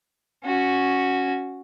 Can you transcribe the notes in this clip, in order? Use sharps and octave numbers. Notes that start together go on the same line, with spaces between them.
C#4 F#4